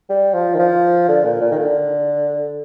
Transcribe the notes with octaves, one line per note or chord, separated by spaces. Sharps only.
G3
F3
D#3
F3
D3
A#2
A#2
D#3
D3